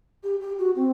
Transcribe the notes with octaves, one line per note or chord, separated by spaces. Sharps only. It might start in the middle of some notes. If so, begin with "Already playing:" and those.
G4
G4
F#4
C4